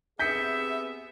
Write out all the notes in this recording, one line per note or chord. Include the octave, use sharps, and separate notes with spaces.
B3 C4 G4 G#4 E5 G6 B6 C#7